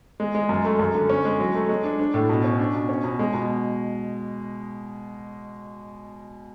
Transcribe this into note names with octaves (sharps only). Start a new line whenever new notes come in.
G#3
G#3
F#2
A3
F#2
D3
C#4
G#3
F#3
A3
G#3
D4
D4
A2
B2
C#4
D4
B2
C#4
B2
G#3
B2